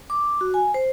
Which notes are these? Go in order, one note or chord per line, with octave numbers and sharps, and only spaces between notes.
D6
F#4
G#5
C5